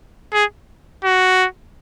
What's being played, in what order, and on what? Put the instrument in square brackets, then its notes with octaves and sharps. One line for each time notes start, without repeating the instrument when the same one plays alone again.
[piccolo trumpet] G#4
F#4